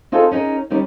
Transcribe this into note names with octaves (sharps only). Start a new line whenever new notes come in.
C4 D#4 F4 G#4 A4
C#4 D#4 G#4 A#4
D#3 G3 C#4 D#4 G4